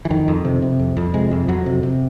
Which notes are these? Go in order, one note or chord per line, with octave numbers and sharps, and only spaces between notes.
E3
F2 D#3
F2
C3
C3
F2
F2
C3 G#3
F2
F2 F#3
C3
C3